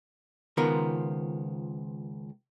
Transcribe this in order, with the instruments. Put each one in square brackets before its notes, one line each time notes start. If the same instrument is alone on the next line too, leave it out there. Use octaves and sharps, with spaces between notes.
[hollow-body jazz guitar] C#2 D#3 F3 B3 F4 A#4